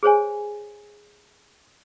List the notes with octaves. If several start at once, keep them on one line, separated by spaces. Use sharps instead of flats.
G#4 C5 C#5 G#5